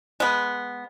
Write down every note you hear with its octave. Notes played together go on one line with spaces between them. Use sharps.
G#3 B3